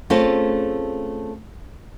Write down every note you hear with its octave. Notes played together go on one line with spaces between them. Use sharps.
A3 C4 C#4 F4 G#4 A4